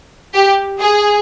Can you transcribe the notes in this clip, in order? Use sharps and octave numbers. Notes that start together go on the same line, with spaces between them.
G4
G#4